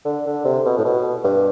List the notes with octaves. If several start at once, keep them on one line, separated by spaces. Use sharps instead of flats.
D3
D3
C3
B2
A2
B2
G2